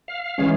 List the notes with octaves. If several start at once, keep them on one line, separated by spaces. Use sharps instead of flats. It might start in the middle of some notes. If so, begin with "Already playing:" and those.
F5
E3 G#3 C#4